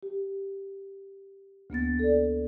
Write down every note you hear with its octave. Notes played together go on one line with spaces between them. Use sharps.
G4
D2 A#3 B3 A6
A4 D5